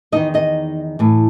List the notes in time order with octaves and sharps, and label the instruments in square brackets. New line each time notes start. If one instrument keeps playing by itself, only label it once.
[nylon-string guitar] E2 D#3 D#4 D#5
D#4 D#5
A2 E3